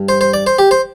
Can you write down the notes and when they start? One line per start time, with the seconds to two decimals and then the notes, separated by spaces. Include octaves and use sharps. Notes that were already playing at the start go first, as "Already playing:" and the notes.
Already playing: G2
0.09 C5
0.21 C5
0.34 D5
0.47 C5
0.58 G4
0.71 C5